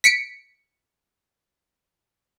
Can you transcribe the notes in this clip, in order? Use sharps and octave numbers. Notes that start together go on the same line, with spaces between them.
B6 C#7 D7